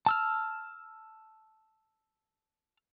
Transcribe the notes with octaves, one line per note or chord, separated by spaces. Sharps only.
A5 E6 F6